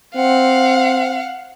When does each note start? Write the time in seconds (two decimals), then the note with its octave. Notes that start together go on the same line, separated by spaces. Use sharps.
0.16 C4 F5 F#5